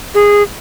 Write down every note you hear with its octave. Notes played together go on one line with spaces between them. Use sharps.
G#4